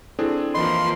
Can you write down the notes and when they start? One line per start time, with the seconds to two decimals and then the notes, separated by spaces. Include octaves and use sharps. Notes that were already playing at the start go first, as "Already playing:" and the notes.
0.19 C4 D4 E4 G#4 A4
0.54 E3 F3 A#3 D#5 B5 C6